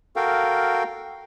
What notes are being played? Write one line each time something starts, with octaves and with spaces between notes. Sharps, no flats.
F#4 A4 A#4 F5 G5